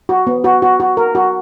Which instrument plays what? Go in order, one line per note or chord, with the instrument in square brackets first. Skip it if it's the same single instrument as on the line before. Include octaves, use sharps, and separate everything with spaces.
[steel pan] F#4
B3
F#4
F#4
F#4
A#4
F#4